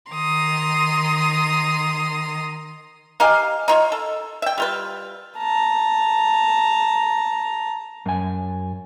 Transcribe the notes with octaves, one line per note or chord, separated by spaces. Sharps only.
D#3 A#5 C6 D#6
D#4 G4 F5 G#5
D#4 F4 C#5
A4
E5 G5
G3 F4 B4
A5 A#5
F#2 G#5